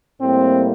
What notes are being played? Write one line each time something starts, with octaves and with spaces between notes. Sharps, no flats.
A2 G3 A#3 C4